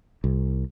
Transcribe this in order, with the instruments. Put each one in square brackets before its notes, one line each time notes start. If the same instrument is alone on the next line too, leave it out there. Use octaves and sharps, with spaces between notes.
[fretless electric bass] C2